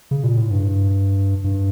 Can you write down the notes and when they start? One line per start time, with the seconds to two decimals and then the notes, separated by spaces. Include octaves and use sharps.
0.11 C#3
0.24 A#2
0.37 A2
0.51 G2
1.44 G2